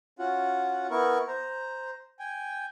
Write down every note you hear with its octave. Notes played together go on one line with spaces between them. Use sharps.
C#4 F4 F#4 F#5
B3 E4 A#4 C#6
C5 A#5
G5 G#5